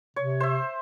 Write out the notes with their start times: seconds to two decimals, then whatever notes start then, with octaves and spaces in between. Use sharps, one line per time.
0.16 C3 C#5
0.40 C5 E5